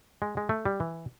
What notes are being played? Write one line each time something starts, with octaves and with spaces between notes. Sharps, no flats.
G#3
G#3
A3
G3
E3